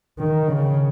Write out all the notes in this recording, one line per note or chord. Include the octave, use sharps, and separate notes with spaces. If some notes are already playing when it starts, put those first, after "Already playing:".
D#3
C#3